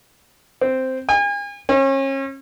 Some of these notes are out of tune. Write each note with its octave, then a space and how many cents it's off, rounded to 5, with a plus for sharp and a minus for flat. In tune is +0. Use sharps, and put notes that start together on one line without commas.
C4 -5
G#5 -40
C#4 -35